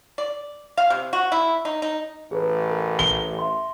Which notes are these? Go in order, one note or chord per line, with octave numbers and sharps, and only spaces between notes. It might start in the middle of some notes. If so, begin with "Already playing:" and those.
D5
F5
C3
F#4
E4
D#4
D#4
A1 G#4 B4
A#4
G7
E5 C6